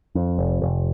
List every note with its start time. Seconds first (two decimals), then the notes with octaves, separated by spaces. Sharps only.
0.15 F2
0.39 F1
0.62 F1